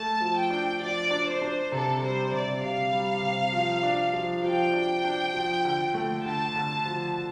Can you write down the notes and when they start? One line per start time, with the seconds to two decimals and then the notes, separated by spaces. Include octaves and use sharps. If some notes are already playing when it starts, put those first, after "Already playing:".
Already playing: A3 A5
0.20 F3
0.36 G5
0.50 D4
0.80 F3 D5
1.11 D4
1.26 C5
1.42 D4
1.71 C3 A4
2.01 G3 C5
2.32 C3 D5
2.62 C3 F5
2.92 G3
3.22 C3
3.52 F3
3.83 D4
4.13 F3
4.43 F3 G5
4.73 D4
5.04 D4
5.34 F3
5.65 D3
5.94 A3
6.25 D3 A5
6.56 D3
6.85 F3